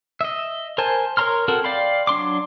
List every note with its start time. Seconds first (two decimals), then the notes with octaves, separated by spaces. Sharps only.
0.21 D#5 E5
0.78 A#4 C5 G#5 A5
1.17 A#4 C#5 A#5 C6 F6
1.48 C4 F#4 A4 A#4
1.64 D5 F5 G5 B5 C6
2.07 F#3 D4 C6 D6